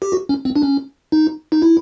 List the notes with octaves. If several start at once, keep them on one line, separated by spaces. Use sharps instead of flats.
G4
F#4
C#4
C4
D4
C#4
D#4
D#4
E4